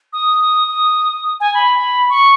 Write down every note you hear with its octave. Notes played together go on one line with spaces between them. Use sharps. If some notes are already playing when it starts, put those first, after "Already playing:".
D#6
D#6
G#5
B5
C#6